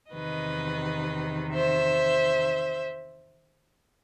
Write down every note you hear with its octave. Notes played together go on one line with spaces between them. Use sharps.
E2 C3 D#3 B4 D#5
C5 E5